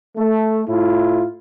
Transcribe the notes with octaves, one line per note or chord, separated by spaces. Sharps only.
A3
A2 E4 F4